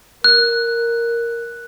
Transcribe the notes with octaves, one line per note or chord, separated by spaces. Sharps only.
A#4 F#6